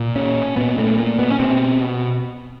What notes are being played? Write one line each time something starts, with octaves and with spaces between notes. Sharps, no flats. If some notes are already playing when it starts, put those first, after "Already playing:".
Already playing: A#2
C#4
A#2 B3
A3
A#3
B3
C#4
B2 C4